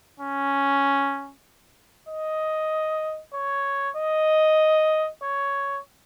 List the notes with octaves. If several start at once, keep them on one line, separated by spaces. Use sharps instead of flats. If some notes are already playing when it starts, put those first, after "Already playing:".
C#4
D#5
C#5
D#5
C#5